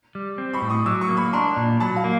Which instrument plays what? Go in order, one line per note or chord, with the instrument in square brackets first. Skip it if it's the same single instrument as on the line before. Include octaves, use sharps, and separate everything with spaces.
[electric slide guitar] G3
C4
[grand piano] B5 C#6
[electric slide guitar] A2
[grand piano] C#6 D#6
[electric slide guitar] F#3 [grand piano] D6 E6
[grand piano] C#6 D#6
[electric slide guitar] A#3
[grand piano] B5 C#6
[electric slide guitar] D4 [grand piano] A#5 C6
[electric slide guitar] A#2
[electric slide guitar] F#3 [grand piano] A5 B5
[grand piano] F5
[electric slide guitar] A#3